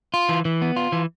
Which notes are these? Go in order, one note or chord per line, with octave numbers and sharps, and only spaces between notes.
F4
E3
E3
B3
F4
E3